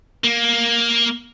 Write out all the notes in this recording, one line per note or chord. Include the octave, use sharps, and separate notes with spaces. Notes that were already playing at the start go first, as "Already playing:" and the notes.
A#3